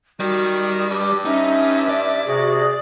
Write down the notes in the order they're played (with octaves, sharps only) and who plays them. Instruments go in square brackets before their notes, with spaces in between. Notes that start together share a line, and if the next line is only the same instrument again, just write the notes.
[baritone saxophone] D#3 [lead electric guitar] G3 [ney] F#4
[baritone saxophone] G2 [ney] G4
[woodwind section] C#4 [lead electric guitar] D#4 [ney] E5
[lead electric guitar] D5
[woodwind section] C3 F#4 [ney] G#4